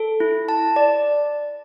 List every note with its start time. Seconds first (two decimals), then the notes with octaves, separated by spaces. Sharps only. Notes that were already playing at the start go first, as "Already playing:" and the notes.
Already playing: A4
0.20 E4
0.49 A5
0.76 D5